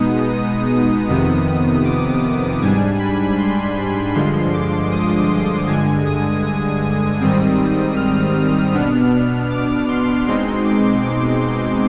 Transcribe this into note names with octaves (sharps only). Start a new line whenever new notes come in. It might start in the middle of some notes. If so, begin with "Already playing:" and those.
Already playing: B2 G#3 B3 D#4 D#6
D#6
F2 C3 D#3 B3
D6
G#2 G3 D4 G#5
B5
C6
G2 D3 F3 G#3 C6
D6
D#6
C6
G2 D3 G#3 G#5
D#6
D#6
G#2 D#3 G3 C4
F6
B2 B3 D4
D6
C6
B2 G#3 C4 D#4 C6
D6
D6
C6